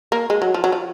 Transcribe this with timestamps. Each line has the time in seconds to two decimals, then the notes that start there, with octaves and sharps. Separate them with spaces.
0.12 A#3
0.30 G#3
0.42 F#3
0.54 F3
0.64 F#3
0.72 F3